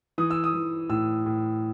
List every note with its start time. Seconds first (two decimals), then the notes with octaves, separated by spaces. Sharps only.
0.18 E3 D#6
0.31 E6
0.44 D#6
0.54 E3
0.89 A2 E6
1.26 A2